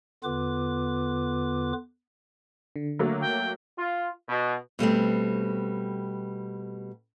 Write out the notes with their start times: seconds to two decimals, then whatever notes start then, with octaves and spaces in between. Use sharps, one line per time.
0.24 E2 D3 B3 F4 B4 D6
2.76 D3
2.99 F#3 A3 A#3
3.21 G5
3.78 F4
4.28 B2
4.79 B2 G3 A3 C4